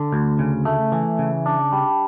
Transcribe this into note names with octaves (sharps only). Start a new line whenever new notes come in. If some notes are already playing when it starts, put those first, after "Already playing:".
Already playing: D3
D2
C#3
A3
E3
C#3
D4
G3